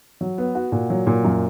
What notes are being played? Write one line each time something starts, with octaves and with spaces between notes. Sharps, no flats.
F#3
B3
F#4
A#2
F#3
A#2
F#2